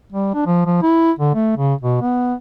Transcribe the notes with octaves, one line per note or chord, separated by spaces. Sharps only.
G3
D4
F3
F3
E4
D3
A3
C#3
B2
B3